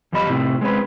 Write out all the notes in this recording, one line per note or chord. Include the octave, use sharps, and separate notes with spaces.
E2 F3 G3 D#5 B5
A2 C3 C4 E4
G#3 C4 C#4 B4